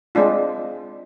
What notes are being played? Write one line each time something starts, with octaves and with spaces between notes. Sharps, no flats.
G#3 C4 D4 F4